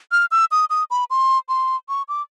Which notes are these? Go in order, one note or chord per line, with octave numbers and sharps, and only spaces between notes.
F6
E6
D#6
D#6
B5
C6
C6
C#6
D6